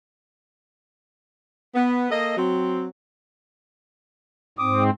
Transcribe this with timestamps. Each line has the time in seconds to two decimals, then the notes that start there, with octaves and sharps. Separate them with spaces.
1.75 B3
2.11 A#3 A4 D#5
2.37 F#3 C4
4.58 G#2 C4 D6 D#6